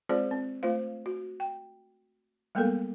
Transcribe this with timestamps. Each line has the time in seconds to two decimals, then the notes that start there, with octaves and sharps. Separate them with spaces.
0.09 G#3 C4 F4 G#4 C5 D5
0.31 C4
0.63 A3 F4 C5 F5
1.06 F#4
1.40 G5
2.55 G3 G#3 A#3 B3 A4 A#4